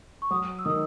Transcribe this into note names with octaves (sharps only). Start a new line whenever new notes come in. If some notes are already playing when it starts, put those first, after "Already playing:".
C#6
F#3 D#6
E6
D#3 D#6